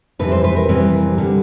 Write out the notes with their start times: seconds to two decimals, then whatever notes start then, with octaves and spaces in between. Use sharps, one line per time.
0.19 F2 C3 E3 G3 B4
0.32 C5
0.44 B4
0.56 A#4
0.69 F2 C3 E3 G3
1.18 D3 G3